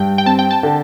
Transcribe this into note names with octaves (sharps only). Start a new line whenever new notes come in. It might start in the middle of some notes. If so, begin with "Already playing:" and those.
Already playing: G2 G5
G5
C4 A5
G5
A5
D3